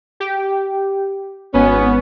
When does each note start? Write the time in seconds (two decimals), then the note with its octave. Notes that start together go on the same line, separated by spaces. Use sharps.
0.20 G4
1.54 G#1 B3 C#4